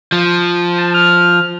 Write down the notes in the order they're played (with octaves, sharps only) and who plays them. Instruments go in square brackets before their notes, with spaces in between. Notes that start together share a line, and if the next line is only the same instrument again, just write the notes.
[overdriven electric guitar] F3
[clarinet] A5
F6